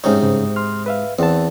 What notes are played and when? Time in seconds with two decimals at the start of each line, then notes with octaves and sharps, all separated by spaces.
0.04 G#2 C3 C#4 D#4 C#5
0.19 G2 C#3
0.56 C6 F6
0.86 B4 E5 F5
1.19 E2 C4 F#5 A5